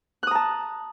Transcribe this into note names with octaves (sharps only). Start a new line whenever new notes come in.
A5 A#5 D#6 F#6